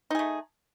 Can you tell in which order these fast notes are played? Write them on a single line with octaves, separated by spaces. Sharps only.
D#4 G#4 A3